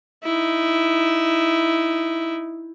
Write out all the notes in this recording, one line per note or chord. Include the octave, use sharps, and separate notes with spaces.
D#4 E4